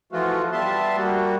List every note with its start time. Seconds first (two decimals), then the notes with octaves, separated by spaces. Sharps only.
0.12 E3 F3 A3 F4 F#4
0.52 G3 B3 E5 A5 C6
0.97 G3 A#3 F#4